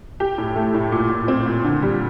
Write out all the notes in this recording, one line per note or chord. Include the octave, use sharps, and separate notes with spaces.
G4
A2
A3
A2
A#2
A#2
C4
A#2
D3
G3